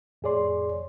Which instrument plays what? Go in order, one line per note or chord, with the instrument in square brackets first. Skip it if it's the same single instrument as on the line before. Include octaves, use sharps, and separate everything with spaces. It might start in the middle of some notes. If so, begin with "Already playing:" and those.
[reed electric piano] F2 A2 G#4 C#5 D5 C6